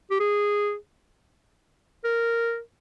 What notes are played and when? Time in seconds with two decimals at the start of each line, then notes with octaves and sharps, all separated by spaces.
0.11 G4
0.20 G#4
2.04 A#4